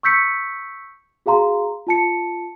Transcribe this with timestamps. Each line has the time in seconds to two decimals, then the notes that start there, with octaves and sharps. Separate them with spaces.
0.03 C#6 E6 G6 B6 C#7
1.26 F#4 G#4 F5 A#5 C6
1.87 F4 A5 C#7